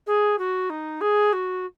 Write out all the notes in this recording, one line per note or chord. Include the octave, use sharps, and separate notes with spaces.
G#4
F#4
D#4
G#4
F#4